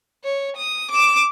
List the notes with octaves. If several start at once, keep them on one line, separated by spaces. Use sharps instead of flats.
C#5
D#6
D6 E7